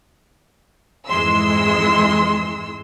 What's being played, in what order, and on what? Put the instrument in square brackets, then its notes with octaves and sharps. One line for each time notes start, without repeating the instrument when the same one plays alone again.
[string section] F2 G#2 E3 G#3 C6 E6